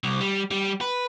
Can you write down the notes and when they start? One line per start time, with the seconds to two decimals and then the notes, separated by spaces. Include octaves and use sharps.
0.04 C2
0.21 G3
0.51 G3
0.81 B4